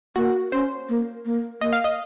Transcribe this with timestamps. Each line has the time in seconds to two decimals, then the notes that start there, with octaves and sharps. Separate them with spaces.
0.16 A#3 F#4
0.52 C#4 C5
0.89 A#3
1.25 A#3
1.60 A#3 D#5
1.73 F5
1.84 D#5